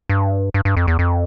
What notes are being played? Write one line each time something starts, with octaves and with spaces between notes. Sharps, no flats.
G2
G2
G2
F2
E2
F2